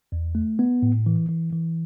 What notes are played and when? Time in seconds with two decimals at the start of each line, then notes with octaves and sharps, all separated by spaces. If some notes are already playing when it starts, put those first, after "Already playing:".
0.12 E2
0.35 A3
0.59 B3
0.82 A2
1.06 E3
1.29 E3
1.53 E3